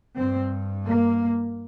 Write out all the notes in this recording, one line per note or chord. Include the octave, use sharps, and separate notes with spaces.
G2 C4
A#3